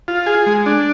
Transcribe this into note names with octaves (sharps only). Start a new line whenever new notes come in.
F4
G#4
G#3
D4